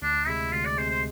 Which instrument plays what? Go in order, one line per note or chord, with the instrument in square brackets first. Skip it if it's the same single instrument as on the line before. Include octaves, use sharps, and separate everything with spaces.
[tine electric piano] D2 [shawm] D4
[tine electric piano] C3 G#3 [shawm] E4
[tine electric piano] D2 [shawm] F4
[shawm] D5
[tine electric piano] C3 G#3 [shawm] C5
[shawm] C5